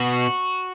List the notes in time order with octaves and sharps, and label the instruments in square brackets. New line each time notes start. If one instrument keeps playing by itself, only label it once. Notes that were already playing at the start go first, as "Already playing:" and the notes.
Already playing: [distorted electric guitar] B2 [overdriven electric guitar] F#4